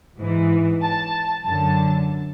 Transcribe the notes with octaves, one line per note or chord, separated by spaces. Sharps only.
G#2 E3
A5
F#2 D3 A5